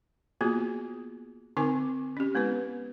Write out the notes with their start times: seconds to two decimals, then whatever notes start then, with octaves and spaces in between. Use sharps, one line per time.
0.41 A#3 B3 F4 F#4 G#4
1.57 D3 C4 D#4 A#4 G#5 D6
2.17 C#4 G4
2.35 G#3 B3 E4 B4